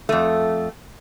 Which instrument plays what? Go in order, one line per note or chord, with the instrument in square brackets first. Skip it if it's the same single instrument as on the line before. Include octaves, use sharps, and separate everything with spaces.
[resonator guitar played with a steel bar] F2 A3